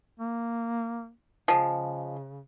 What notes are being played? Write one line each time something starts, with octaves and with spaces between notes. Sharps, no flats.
A#3
C#3 F3 G#3